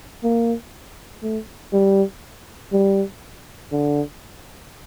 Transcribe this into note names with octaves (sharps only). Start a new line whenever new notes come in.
A#3
A3
G3
G3
D3